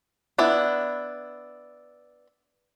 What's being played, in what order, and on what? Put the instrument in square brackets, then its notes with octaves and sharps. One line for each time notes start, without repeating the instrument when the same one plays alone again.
[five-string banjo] B3 D4 E4